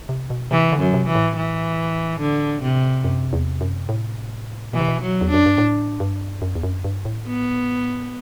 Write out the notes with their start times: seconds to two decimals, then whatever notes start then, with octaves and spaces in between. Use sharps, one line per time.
0.09 C3
0.30 B2
0.51 C3 E3
0.72 D3
0.79 F#2
0.94 C3
1.07 E3
1.15 A2
1.36 E3
2.20 D3
2.62 C3
3.04 F#2
3.33 E2
3.61 F#2
3.89 A2
4.73 B2 E3
4.80 C3
4.88 B2
5.02 F#3
5.21 E2
5.30 F#2 D4
5.46 G2
5.58 A2
6.00 G2
6.42 F#2
6.55 E2
6.63 F#2
6.84 G2
7.05 A2
7.27 B3